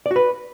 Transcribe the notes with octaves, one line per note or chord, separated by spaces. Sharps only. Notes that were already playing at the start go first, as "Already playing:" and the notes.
D5
F#4
B4